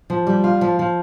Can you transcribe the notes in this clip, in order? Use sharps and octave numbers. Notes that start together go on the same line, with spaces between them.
F3
G3
F4
F3
F3